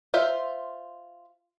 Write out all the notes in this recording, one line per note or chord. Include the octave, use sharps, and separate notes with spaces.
F4 C5 E5